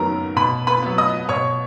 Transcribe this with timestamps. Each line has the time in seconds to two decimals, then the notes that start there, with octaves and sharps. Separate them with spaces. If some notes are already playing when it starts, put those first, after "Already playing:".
Already playing: F#2 D#3 F#3 B3 A#4 A#5
0.36 B2 B4 B5
0.67 B4 B5
0.82 F#3 B3
0.98 D#5 D#6
1.29 B2 C#5 C#6